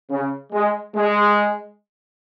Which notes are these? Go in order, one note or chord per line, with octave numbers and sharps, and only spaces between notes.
C#3
G#3
G#3